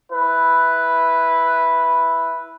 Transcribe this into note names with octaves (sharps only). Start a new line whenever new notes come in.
E4 B4